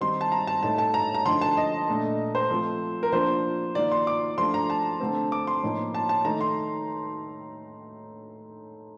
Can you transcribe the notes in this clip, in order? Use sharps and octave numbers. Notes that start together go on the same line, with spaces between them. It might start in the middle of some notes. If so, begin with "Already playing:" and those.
D#3 G3 C4 D#4 C6
A5
A#5
A5
A2 A3 D#4 A5
A5
A#5
A#5
D3 F3 A3 D#4 C6
A5
D#5
A#2 A3 D4
C5
F3 A3 C4 F4
A#4
F3 A#3 D4 F4 C5
D#3 A#3 F4 D5
C6
D6
F3 A3 D4 F4 C6
A#5
A5
D3 A3 C4
D6
C6
A2 F3 A#3 D#4
A5
A5
D#3 A3 D#4 A#5
C6